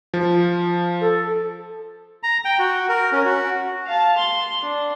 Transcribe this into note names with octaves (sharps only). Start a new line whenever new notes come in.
F3
A4
A#5
G5
F#4
A#4
C#4
F#4
F5 A5
C6
D4